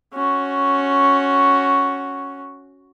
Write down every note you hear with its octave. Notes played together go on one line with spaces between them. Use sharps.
C#4 F#4